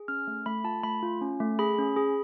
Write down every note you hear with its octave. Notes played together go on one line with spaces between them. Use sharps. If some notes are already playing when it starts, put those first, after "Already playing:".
Already playing: G#4
C#4 F6
A3
A3 B5
F4 A5
A3 B5
F4
C#4
A3
G#4 B5
C#4
G#4